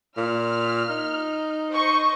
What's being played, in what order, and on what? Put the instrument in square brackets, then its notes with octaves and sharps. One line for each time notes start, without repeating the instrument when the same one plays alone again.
[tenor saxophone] A#2 [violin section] F6
[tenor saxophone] D#4
[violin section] C5 D#5 C#6